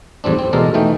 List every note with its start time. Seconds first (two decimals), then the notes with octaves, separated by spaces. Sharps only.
0.24 E2 A2 G3 C4 D4
0.39 C4
0.53 E2 B2 G#3 A4 A#4 D5
0.74 E3 A3 D#4 G5